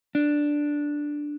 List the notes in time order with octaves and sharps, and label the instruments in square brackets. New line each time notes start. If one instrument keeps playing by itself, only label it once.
[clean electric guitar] D4